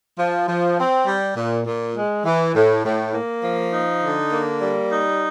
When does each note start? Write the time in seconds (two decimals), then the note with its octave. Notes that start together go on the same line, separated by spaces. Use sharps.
0.19 F3
0.48 F3
0.78 C4
1.07 G3
1.36 A#2
1.67 A#2
1.96 G#3
2.25 E3
2.55 A2
2.85 A2
3.14 A#3
3.44 F3
3.73 D#4
4.03 D3
4.33 A#3
4.62 G3
4.92 D#4